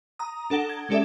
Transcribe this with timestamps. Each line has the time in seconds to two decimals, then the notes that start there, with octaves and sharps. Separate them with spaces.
0.19 A#5 D#6
0.50 D4 A4 F#5 A#6 G7
0.69 G#6
0.89 G#3 C#4 G4 A4 D5 E5